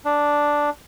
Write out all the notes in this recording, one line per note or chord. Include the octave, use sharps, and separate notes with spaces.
D4